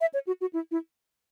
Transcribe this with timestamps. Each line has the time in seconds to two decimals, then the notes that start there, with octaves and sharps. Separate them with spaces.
0.01 E5
0.14 C#5
0.27 F#4
0.41 F#4
0.53 E4
0.71 E4